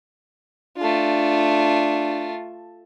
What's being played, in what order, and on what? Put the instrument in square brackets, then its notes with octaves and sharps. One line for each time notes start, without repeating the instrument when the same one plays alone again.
[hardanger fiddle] A3 F4 [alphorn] D4